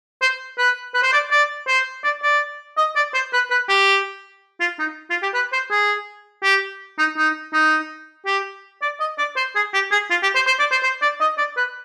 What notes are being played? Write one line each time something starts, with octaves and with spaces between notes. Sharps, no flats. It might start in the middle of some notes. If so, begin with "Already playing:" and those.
C5
B4
B4
C5
D5
D5
C5
D5
D5
D#5
D5
C5
B4
B4
G4
F4
D#4
F4
G4
B4
C5
G#4
G4
D#4
D#4
D#4
G4
D5
D#5
D5
C5
G#4
G4
G#4
F4
G4
C5
C5
D5
C5
C5
D5
D#5
D5
B4